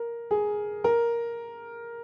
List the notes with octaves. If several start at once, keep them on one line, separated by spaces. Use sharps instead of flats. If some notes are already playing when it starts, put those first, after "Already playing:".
Already playing: A#4
G#4
A#4